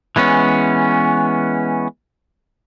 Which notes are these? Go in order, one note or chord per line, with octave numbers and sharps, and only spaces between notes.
E3 G#3 B3 C#4